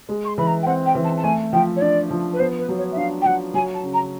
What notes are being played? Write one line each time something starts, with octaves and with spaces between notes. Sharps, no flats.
G#3
C#6
C6
E3 B5
A#5
G5
C4 F#5
G5
E3
A5
A5
A3 G#5
F3 G5
C#5
D4 D5
F3
B4
B3 C5
B4
F#3
C#5
E5
D4 F5
G5
F#3 F#5
F#3 G#5
A5
C#3
A#5